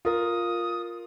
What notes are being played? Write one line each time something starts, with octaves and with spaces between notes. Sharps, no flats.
F4 A#4 D#6